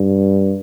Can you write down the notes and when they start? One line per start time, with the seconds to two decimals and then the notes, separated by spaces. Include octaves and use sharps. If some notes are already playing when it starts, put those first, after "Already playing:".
Already playing: G2